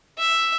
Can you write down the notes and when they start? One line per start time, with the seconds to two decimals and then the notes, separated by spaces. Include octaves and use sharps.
0.19 E5